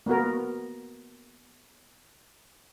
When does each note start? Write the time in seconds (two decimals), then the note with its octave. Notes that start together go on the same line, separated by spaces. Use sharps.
0.06 A#3 B3 F#4 A#4